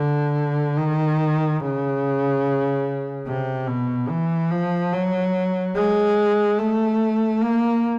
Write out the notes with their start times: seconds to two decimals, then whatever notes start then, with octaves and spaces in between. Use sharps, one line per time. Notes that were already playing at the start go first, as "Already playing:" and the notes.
Already playing: D3
0.77 D#3
1.61 C#3
3.26 C3
3.67 B2
4.09 E3
4.51 F3
4.93 F#3
5.75 G#3
6.59 A3
7.42 A#3